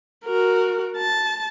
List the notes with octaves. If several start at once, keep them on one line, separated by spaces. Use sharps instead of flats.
F#4 A#4
A5